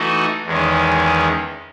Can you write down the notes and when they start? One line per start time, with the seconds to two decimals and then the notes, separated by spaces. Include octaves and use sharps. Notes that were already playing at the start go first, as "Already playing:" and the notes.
Already playing: E3 A3 D#4 F#4 A4
0.46 E2 D#3 G#3 C#4